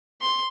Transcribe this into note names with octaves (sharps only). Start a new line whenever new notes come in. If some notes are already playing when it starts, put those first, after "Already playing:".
C6